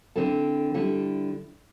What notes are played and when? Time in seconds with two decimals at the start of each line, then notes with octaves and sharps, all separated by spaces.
0.16 D3 C4 E4 A4
0.74 D3 G3 E4 A4